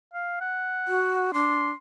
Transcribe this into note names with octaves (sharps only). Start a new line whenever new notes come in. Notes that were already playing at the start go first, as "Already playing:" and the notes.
F5
F#5
F#4
D4 C6